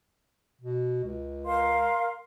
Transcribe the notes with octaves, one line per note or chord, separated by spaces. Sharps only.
B2
C#2
A#4 F5 C6